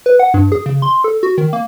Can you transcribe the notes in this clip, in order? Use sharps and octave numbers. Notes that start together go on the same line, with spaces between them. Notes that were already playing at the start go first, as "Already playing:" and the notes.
B4
F#5
G2
G#4
C#3
C6
A4
F#4
D#3
A#3